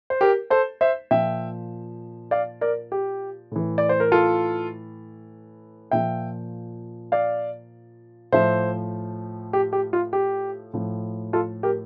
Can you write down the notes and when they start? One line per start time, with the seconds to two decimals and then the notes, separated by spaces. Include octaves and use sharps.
0.10 C5
0.21 G4 A#4
0.50 A4 C5
0.81 C5 E5
1.11 A#2 F3 E5 G5
2.31 D5 F5
2.61 A#4 D5
2.92 G4
3.52 A2 E3
3.78 D5
3.89 C5
4.00 A#4
4.12 F4 A4
5.91 A#2 F3 E5 G5
7.12 D5 F5
8.32 A2 F3 C5 E5
9.53 G4
9.73 G4
9.93 F4
10.13 G4
10.73 A2 F3
11.33 F4 A4
11.63 G4 A#4